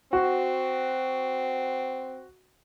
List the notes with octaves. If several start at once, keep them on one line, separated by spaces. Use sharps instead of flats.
C4 F#4